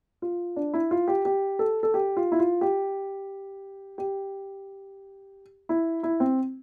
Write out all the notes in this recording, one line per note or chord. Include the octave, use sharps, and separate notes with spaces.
F4
D4
E4
F4
G4
G4
A4
A4
G4
F4
E4
F4
G4
G4
E4
E4
C4